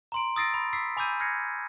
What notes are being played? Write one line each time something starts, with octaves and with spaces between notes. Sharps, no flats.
A#5 C6 D7
D#6 E6 A6 A#6 C7 D7
B5
D6 E6 B6 C7
G#5 B5 D6 E6 G6 D#7
F6 G#6 A#6 C7 C#7